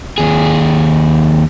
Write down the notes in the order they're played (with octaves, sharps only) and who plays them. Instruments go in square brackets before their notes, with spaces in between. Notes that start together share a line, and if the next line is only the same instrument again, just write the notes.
[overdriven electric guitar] D#2 G#4